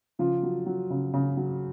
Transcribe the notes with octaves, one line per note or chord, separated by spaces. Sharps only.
C#3 F3 F4
F#3
F#3
C#3
C#3
F#3